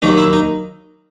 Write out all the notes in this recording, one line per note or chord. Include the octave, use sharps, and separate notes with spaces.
D#2 D#3 F#3 A#3 D#4 D#5
E4 E5
D#4 D#5